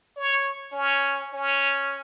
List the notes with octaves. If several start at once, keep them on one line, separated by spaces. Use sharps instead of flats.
C#5
C#4
C#4